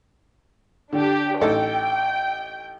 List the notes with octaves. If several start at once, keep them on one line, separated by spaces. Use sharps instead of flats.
D3 D4 G4
A1 D#4 A4 G5